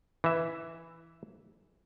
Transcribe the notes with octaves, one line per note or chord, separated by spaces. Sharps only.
E3 E5